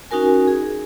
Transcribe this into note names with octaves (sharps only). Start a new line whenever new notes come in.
C#4 D#4 F#4 A#4 G#5
G#4